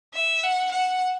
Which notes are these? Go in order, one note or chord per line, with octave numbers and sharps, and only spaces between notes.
E5
F#5
F#5